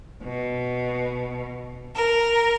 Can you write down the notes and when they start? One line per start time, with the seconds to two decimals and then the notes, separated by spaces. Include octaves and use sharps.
0.23 B2
1.94 A#4